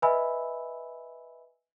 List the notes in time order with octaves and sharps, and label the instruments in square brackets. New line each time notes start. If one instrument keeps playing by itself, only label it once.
[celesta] B4 D#5 E5 G#5 B5 E6